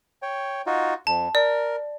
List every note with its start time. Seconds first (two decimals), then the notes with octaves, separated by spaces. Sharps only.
0.22 C#5 G5
0.66 D#4 F4 F#4
1.07 F2 A5
1.35 A#4 D5